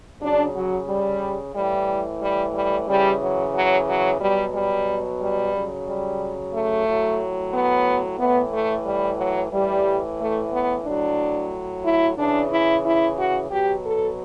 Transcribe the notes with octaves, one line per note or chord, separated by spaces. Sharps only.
C#3 F#3 D4
F#3
G3
A2 E3 G3
G3
G3
C#3 E3 G3
F#3
F#3
F#3
B2 F#3 G3
G3
G3
C#3 F#3
G3
A3
A2 F#3
B3
A2 E3 B3
A3
G3
F#3
A2 E3 G3
A3
B3
A2 F#3 D4
E4
C#3 E3 D4
E4
E4
F#4
B2 F#3 G4
A4